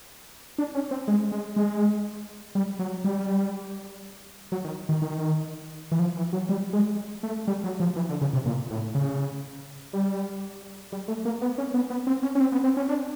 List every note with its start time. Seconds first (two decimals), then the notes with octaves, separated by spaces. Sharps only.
0.58 D4
0.75 C#4
0.91 C4
1.08 G#3
1.32 G#3
1.56 G#3
2.55 G3
2.79 F#3
3.04 G3
4.52 F#3
4.64 D#3
4.89 D#3
5.02 D#3
5.92 E3
5.99 F3
6.17 E3
6.33 F#3
6.49 G3
6.73 G#3
7.23 A3
7.47 G3
7.64 F#3
7.80 F3
7.96 E3
8.09 D3
8.21 C#3
8.33 C3
8.45 A#2
8.70 A2
8.95 C#3
9.93 G3
10.92 G3
11.08 A3
11.25 A#3
11.42 B3
11.58 C#4
11.74 B3
11.90 B3
12.07 C4
12.23 C#4
12.35 C#4
12.40 C4
12.52 B3
12.64 C4
12.77 C#4
12.88 D4